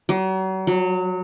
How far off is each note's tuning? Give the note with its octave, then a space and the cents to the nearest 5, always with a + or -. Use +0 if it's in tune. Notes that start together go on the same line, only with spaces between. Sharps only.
F#3 +40
F#3 -20